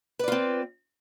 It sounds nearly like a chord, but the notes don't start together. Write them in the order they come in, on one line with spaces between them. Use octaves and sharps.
B4 D5 F4 C4